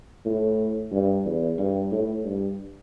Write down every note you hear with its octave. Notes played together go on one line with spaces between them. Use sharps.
A2
G2
E2
G2
A2
G2